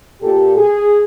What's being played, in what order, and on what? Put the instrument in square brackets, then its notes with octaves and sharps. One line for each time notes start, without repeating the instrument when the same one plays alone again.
[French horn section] A#2 G4 A4
G#4